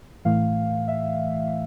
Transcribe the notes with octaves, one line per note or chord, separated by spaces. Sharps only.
A2 E3 A3 F5
E5